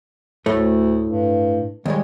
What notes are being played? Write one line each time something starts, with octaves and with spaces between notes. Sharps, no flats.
D2 A2 A3
G2
D#2 G3 G#3